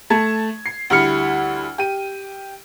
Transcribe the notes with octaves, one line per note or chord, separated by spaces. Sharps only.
A3 A5 G#6
C7
D2 G3 E4 F6 C#7
G4 D#7